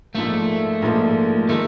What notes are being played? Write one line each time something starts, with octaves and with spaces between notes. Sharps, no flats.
A#1 G#2 F3 A3 A#3
A#1 G#2 F3 A#3
D#3 G#3 A3